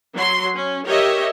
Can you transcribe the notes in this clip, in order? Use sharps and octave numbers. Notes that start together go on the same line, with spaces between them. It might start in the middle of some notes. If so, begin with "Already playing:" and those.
F#3 C6
C#4
G4 A#4 C#5 D#5 E5